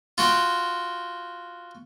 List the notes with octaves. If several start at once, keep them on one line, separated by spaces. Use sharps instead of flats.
F4 F#4 G5